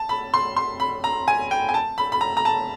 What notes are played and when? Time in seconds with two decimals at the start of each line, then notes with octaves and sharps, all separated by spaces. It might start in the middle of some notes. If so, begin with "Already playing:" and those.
Already playing: A5
0.09 B5
0.34 C6
0.57 C6
0.80 B5
1.04 A#5
1.28 G#5
1.51 G5
1.69 G#5
1.74 A5
1.98 B5
2.12 B5
2.21 A#5
2.37 A#5
2.45 A5